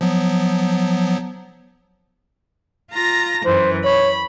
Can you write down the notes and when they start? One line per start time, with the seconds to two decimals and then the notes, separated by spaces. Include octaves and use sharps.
0.01 F3 F#3 B3
2.93 F4 A#5 A#6
3.45 F#2 E3 C5
3.84 C#5 B5